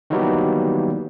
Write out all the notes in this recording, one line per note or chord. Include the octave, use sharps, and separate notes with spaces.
D#3 E3 F#3 G3 A#3 B3